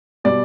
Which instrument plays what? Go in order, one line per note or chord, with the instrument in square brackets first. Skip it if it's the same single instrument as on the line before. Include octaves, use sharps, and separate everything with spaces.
[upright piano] B2 G3 D5